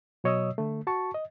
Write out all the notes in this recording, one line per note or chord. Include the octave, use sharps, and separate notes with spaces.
B2 F#3 C#5 D#5 D#6 E6
D3 A3
F#4 A5 C#6
D#5